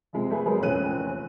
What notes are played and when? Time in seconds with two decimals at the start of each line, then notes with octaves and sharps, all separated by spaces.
0.13 F2 C3 G#3
0.30 A3 G#4 B4
0.46 F#3 G#3 B3 G#4 A#4
0.60 F1 A#1 E2 C#4 F#6 D#7